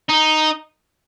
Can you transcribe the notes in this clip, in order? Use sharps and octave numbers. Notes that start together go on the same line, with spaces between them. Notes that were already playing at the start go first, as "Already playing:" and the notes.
D#4